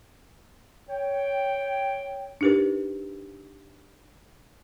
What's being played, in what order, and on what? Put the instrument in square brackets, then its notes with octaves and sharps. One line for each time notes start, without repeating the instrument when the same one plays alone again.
[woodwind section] C#5 G5
[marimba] D4 D#4 G4 A#4 B4